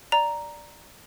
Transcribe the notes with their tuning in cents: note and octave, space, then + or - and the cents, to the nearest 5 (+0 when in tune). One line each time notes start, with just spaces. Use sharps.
D5 +0 A#5 +0